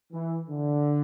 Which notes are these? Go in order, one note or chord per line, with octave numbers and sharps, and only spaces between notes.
E3
D3